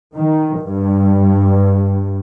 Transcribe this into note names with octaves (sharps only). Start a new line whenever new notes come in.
D#3
G2